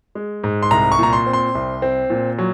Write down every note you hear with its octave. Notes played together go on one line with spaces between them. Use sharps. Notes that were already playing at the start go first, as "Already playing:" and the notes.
G#3
G#2
C6
C2 A#5
C#6
A#2 A#5
C6
C4
C6
C2
C4
A#2
F#3